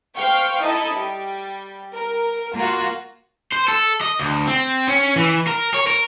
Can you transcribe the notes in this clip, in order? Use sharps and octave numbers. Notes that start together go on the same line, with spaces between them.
C5 F5 G5 C#6
D#4 E4 A4 D#5
G3
A#4
A#3 F4 F#4
C5
A4
D#5
D2
C4
C#4
E3
A#4
C#5
A#4